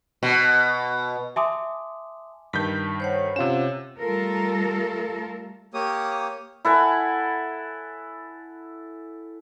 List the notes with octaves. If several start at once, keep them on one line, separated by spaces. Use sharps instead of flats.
B2
E5 G#5 A5 C6 D6 D#6
G2 D#3 A5 G6 B6
C5 C#5 F#5
C3 C#4 F4 E7
G3 A3 F4 A4 A#4
A#3 G4 C#5 D#6
E4 A4 F#5 G#5